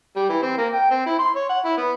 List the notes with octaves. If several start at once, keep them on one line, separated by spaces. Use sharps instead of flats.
G3
E3
C4
A#3
G5
C4
E4
C6
C#5
F#5
E4
B3